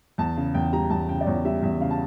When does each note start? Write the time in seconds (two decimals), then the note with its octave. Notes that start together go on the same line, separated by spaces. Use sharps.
0.18 E2 A5
0.37 C#3
0.54 E2 G5
0.73 G3 A#5
0.90 E2 A5
1.09 C#3 G5
1.21 D5
1.27 E2 C#5
1.45 G3 E5
1.63 E2 E5
1.80 C#3 F5
1.91 A5